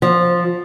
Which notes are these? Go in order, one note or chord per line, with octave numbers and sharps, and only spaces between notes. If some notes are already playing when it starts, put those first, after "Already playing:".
F3